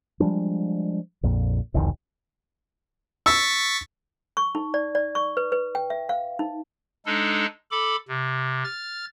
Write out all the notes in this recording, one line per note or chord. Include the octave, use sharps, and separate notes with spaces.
F3 G3 G#3 D4
A#1 F2 A#2
E1 C2 F2 D#3
C#6 E6 A6 B6
C#6
D#4
D5
D5
C#6
B4
B4
G5
E5
F5
D#4
G#3 D4 D#4 A4
A4 B5 D6
C3
F6 A6